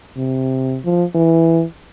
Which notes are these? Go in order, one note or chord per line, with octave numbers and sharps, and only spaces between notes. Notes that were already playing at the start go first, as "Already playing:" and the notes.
C3
F3
E3